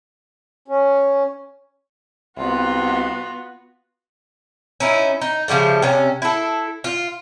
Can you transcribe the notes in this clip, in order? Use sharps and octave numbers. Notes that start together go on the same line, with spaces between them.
C#4
C2 B3 F4 F#4
C#4 D#4 E4
D#4
C#3 F3 G3 A3
C3 C#4
E4 A4
F4